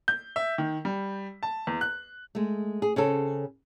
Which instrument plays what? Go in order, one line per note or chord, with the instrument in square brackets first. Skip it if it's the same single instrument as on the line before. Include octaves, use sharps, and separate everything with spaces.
[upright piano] G6
E5
D#3
G3
A5
E2
F#6
[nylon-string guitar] G#3 A3
G#4
C#3 C4 C#4 A4